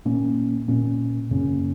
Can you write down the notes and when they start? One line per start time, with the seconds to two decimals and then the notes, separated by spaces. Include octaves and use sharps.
0.05 A#2 A#3 C#4
0.68 A#2 A#3 C#4
1.31 F#2 C#3 A#3 C#4